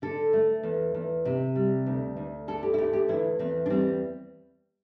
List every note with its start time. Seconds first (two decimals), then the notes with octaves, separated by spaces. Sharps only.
0.02 D3 A4
0.33 A3
0.63 E2
0.94 E2
1.25 C3
1.56 G3
1.86 D2
2.17 D2
2.48 D3 A4
2.63 G4
2.74 E4
2.78 A3 G4
2.93 G4
3.08 E2 E4
3.39 E2 C4
3.66 D4
3.70 G3 C4